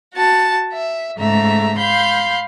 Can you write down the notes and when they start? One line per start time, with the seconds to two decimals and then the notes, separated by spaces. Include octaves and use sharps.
0.14 F#4 A5
0.73 E5
1.18 G#2 C#3 A3 E5 A#5
1.78 F5 B5 C6 G6